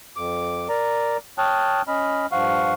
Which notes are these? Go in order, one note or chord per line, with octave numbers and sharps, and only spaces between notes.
F2 D6
A#4 D5 A#5
C#5 G5 A5 D#6 F6 F#6
C#4 D#5 B5 F6
G2 F3 F5 F#5 C#6 F6